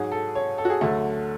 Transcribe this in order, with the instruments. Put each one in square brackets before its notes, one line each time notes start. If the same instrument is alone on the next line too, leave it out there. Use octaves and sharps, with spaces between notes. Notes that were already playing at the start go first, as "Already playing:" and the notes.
Already playing: [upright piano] G#2 F#3 G#4
A4
C#5
A4
F#4
G#4
D2 D3 F#3 A3